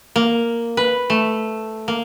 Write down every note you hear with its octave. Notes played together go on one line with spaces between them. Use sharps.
A#3
B4
A3
A#3